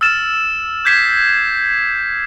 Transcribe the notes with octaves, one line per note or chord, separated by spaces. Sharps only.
E6 F6 A6 E7
D6 G6 G#6 B6 C7 E7